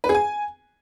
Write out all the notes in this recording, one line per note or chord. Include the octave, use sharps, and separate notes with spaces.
B4
G#4
G#5